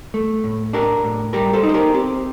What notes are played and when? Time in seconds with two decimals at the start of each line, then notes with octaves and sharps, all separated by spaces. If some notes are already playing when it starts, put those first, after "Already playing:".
0.14 A3
0.44 A2
0.73 D4 G4 A#4
1.04 A2
1.33 G3 G4 A#4
1.53 A4 C5
1.63 D#4
1.69 C5
1.74 G4 A#4
1.94 C4 G4